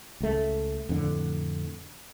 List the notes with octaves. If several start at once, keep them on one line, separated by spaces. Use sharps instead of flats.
C#2 A3
F2 A2 D3